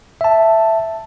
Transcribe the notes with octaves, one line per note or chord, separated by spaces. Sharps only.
E5 A5